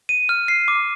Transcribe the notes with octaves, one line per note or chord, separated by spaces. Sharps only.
D#7
F6
C7
D6